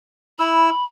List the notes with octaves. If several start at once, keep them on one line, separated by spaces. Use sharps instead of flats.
E4 B5 E6